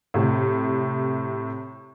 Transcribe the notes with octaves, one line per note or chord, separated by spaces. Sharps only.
A2 C3